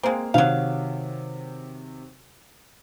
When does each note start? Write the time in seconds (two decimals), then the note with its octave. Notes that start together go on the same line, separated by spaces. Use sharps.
0.03 G#3 A#3 C4 F5
0.34 C3 D#3 F#3 F5